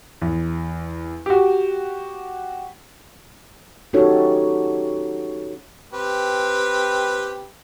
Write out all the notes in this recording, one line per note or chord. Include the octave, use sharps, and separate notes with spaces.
E2
F#4 G4
C#4 D#4 F#4 G4 A4 C#5
C4 G4 B4